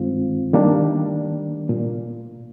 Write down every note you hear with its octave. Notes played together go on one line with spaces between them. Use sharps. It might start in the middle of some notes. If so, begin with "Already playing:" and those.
Already playing: G2 D#3 G#3 C4 F4
D#3 G3 A#3 D4
A#2